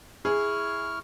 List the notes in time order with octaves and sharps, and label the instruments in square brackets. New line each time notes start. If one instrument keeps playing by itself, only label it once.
[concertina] E4 C#6 F6 [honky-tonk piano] G#4